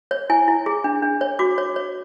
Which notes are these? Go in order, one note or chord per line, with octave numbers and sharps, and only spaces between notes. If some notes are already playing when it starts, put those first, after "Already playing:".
C#5
E4 G#5
E4
G#4
D4
D4
C#5
F#4 D6
C#5
C#5